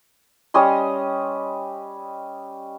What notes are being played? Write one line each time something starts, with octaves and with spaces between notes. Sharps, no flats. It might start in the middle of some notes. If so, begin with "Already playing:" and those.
G3 C#4 D#5 C6